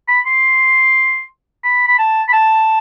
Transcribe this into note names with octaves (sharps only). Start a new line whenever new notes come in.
B5
C6
B5
B5
A5
B5
A5